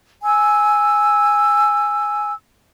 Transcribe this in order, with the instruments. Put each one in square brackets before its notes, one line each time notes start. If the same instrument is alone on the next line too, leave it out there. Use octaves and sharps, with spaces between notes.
[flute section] G#5 E6